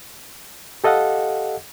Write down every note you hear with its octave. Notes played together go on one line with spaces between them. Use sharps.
G4 A4 D#5 F5 F#5